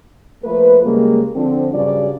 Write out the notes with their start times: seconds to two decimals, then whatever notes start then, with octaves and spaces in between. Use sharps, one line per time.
0.43 F3 A3 A#3 B4
0.85 C#3 G3 G#3 A#3
1.36 D3 F3 C4
1.73 G2 C#3 F#3 G3 D5